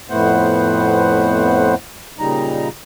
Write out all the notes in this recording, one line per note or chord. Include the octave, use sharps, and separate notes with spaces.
F2 A2 A3 B3 C5 F#5
A#2 C#3 G3 D#4 A#5